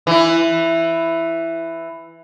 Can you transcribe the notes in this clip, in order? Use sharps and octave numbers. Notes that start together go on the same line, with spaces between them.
E3 E4